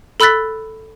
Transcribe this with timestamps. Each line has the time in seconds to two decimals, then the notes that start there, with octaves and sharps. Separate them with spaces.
0.20 A4 B5 E6 F#6 A6 B6